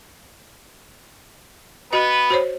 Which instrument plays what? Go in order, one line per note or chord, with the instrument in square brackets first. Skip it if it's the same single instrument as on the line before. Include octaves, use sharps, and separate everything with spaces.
[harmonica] B3 B4 [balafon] F#4 D#5
[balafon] F#4 C5 C#5